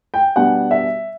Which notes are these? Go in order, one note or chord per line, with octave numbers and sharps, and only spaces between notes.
G5
B2 G3 B3 D4 F#5
E5